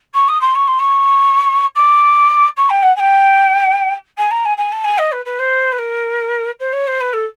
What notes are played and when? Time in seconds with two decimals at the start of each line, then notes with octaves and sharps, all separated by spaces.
0.14 C#6
0.28 D#6
0.41 C6
0.55 C#6
0.67 C6
0.79 C#6
1.75 D6
2.57 C#6
2.69 G5
2.82 F#5
2.96 G#5
2.99 G5
4.17 G#5
4.30 A#5
4.45 G#5
4.57 G#5
4.72 A5
4.84 G#5
4.98 D#5
5.12 B4
5.25 B4
5.38 C5
5.72 B4
5.78 A#4
6.59 C5
6.72 C#5
6.87 C5
7.00 B4
7.13 A4